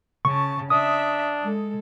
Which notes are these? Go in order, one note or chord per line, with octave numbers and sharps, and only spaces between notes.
C#3 A5 C#6
D4 E5 D#6
G#3 A4